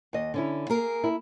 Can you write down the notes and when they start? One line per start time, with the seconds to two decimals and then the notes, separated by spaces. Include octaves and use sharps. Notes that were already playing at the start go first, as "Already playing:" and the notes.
0.13 D#2 D#5
0.34 D3 C#4 E4
0.69 A#3 G#4 A#4
1.04 E4